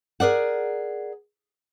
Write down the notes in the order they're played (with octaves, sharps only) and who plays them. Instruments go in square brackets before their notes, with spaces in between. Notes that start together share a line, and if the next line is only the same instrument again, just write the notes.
[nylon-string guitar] G#4 A#4 D5 F#5